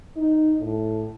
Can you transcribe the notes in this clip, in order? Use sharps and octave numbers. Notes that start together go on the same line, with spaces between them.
D#4
A2